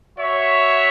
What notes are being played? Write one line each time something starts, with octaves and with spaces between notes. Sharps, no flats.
F#4 C#5 E5